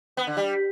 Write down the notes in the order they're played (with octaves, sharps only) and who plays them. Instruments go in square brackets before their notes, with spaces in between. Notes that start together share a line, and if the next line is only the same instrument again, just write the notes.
[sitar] B3
D3
G3